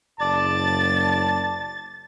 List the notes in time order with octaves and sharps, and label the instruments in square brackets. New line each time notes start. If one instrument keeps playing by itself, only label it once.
[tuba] F#1 [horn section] D5 A5 [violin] A6